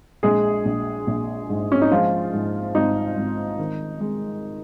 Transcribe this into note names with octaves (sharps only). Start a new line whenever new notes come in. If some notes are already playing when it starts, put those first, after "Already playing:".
A#1 G#3 G#4
A#1
A#1
G#2
C#4
D#4
F3 G#3 F4
G#2
G#1 D#4
G#1
D#3
G#3